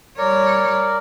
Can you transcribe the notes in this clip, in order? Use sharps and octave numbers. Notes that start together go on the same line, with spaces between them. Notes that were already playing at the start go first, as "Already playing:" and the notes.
G3 A#4 C#5 D5